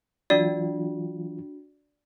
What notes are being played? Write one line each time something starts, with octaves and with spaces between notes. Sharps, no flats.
E3 F#3 D4 F4 F#4 D5